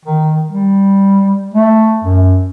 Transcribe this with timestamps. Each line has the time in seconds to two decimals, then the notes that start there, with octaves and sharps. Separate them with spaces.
0.05 D#3
0.51 G3
1.54 A3
2.04 F#2